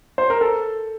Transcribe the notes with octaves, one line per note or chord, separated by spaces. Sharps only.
C5
A#4
A4